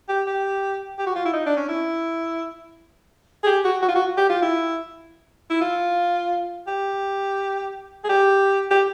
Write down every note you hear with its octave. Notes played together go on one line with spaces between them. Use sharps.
G4
G4
G4
F#4
F4
E4
D#4
D4
C#4
E4
G#4
G4
F#4
F#4
F4
F#4
G4
F4
E4
E4
F4
G4
G#4
G4
G4